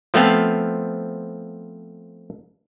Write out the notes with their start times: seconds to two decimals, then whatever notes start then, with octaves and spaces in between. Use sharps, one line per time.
0.14 F3 A3 B3 C4 F5